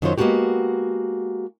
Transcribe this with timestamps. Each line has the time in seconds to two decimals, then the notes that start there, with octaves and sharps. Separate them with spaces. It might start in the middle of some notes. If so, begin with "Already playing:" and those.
0.02 F#2 D#3 F#3 F4 C5 C#5
0.18 G#3 A#3 B3 D4 F#4 G4